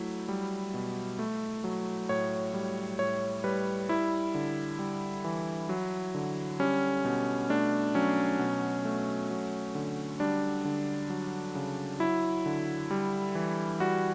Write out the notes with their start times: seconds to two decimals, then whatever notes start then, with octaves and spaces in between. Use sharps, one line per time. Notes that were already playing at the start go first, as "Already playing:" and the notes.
Already playing: F#3 A3 E4
0.29 G3
0.74 B2
1.19 A3
1.64 F#3
2.09 A2 C#5
2.54 G3
2.99 A2 C#5
3.44 G3 B4
3.89 G3 E4
4.35 D3
4.79 G3
5.24 E3
5.69 F#3
6.15 D3
6.60 G3 C#4
7.05 B2
7.50 A3 D4
7.95 F#3 C#4
8.39 B2
8.85 A3
9.30 F#3
9.75 D3
10.20 G3 D4
10.65 D3
11.10 F#3
11.55 C#3
12.00 F#3 E4
12.46 D3
12.91 G3
13.35 E3
13.80 G3 F#4